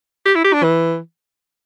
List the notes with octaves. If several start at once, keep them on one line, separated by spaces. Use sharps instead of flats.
G4
E4
G4
D4
E3